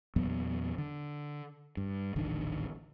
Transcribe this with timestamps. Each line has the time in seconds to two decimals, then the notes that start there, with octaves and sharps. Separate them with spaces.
0.16 E2 A#2 F#3 B3
0.78 D3
1.77 G2
2.16 D#1 A1 D3 D#3